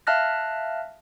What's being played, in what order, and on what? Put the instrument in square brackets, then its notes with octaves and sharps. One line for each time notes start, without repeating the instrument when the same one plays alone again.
[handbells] E5 F5 A5 F6 F#6 A#6